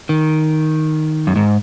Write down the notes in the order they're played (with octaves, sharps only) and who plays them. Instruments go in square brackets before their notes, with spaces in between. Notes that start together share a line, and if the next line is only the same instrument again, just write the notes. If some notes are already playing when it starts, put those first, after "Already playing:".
[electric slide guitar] D#3
F#2
G#2